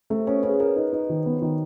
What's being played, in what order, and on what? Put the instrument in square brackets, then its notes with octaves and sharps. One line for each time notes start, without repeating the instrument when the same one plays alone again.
[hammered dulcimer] C3 [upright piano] A3
[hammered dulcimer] B2 [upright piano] C#4
[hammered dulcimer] C#3 [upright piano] C#4
[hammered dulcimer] B2 [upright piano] A#4
[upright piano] D#4
D#4
D#3
B3
D#3